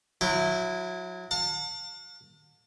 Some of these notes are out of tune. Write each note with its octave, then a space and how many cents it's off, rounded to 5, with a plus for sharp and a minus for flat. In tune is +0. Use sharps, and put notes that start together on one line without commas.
F#3 -25 E4 +0 G5 +0
F5 +45 A5 +35